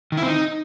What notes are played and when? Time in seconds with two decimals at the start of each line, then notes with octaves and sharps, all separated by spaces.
0.12 D#3
0.17 E4
0.22 C4
0.28 D#4